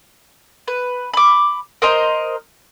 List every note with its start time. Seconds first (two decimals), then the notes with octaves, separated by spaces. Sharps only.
0.68 B4
1.14 B5 D6
1.82 A#4 C5 D#5 A#5